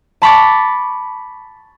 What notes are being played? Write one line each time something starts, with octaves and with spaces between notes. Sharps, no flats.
A5 B5 C#6 D6 A6